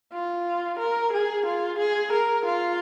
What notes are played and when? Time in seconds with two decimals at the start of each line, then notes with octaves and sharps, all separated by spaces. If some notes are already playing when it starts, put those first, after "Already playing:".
0.13 F4
0.79 A#4
1.12 G#4
1.46 F4
1.78 G#4
2.12 A#4
2.45 F4